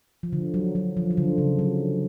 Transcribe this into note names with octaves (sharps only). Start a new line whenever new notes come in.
F3
D3
F#3
F#3
F3
F3
D3
C#3
F#3